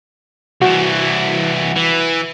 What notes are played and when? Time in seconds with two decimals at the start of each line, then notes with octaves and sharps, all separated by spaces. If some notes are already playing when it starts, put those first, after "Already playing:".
0.62 C2 E3 F#4
1.76 E3